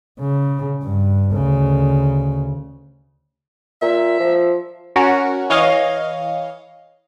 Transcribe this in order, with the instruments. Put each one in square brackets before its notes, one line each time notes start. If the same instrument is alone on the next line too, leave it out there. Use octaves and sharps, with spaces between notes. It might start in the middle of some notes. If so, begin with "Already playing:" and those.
[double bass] C#3
G2
D2 C#3
[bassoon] A#2 [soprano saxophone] E5
[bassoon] F3
[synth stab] C#4 F#4 A#4 C#5
E3 C#5 D#5 F5